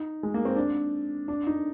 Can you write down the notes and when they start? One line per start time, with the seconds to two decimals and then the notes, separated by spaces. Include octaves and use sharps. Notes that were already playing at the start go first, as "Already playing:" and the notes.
Already playing: D#4
0.23 G#3
0.34 A#3
0.45 C4
0.56 D4
1.28 D4
1.47 D#4